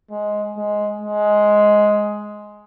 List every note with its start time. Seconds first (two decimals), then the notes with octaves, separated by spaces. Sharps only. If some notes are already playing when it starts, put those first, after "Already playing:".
0.11 G#3
0.57 G#3
1.01 G#3